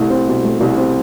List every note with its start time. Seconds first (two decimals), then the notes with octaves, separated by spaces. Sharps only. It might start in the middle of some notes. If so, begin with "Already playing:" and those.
Already playing: C2 A3
0.10 C4
0.28 B2
0.44 A3
0.61 C2
0.78 C4